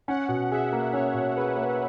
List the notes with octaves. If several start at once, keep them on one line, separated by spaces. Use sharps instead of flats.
C#4 F#5
B2
G#4 E5
A#3
C#4 C#5
B2
G#4 B4
A#3